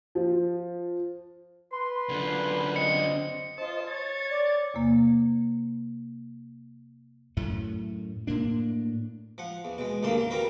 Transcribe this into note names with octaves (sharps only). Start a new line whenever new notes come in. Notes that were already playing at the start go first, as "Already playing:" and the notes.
F3
B4 C6
F#2 D3
C4 D#5 C#7
F4 C5 D#5 A5
C#5 G#6 A6
D5
E2 C3 A#3
F#2 A2 A3
A2 A#3 D4
F3 F#5
E2
B2 G#3
D#2 A2 C#3 A#3 D4 C6
F#3
G3 C4 F4 F#4 A#4 B4